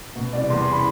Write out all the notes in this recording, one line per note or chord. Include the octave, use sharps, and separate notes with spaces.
B2
C2 D5
E2 C6
C6
B5